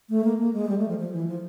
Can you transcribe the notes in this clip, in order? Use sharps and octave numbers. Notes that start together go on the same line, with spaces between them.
A3
A#3
A#3
G#3
G3
A3
F3
F3
E3
F3